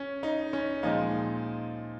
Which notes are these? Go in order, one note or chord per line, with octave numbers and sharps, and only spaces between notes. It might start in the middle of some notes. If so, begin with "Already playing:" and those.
Already playing: C#4
D#4
C#4
A#2 F3 G#3 D#4